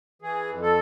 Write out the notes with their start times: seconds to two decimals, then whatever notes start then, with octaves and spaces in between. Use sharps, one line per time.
0.22 E3 G#4
0.49 F2
0.62 A4